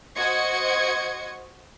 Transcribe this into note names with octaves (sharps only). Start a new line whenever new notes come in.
F#4 C5 D#5 C#6 G#6 C#7